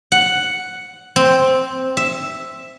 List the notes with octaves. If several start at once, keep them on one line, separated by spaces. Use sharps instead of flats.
F#5
C4
E5